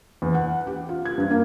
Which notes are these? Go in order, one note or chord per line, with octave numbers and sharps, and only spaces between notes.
E2
F#5
G4
F4
G#6
G2
A#3